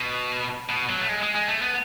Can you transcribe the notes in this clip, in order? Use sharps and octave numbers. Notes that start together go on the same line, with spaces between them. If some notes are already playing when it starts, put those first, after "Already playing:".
Already playing: B2
B2
F#3
A3
G#3
G#3
G#3
A3
B3